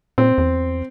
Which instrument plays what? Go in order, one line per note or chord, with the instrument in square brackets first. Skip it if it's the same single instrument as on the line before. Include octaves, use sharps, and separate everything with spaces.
[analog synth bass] A#2 [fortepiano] C4
[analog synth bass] E2